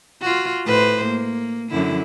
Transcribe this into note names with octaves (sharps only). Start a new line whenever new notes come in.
F4 F#4
A2 B4 C5
A#3
F#2 D3 E4